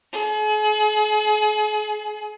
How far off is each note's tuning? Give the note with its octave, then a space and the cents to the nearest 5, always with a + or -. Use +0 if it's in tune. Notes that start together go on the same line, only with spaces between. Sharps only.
G#4 +40